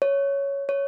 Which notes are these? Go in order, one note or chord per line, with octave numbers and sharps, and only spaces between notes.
C#5
C#5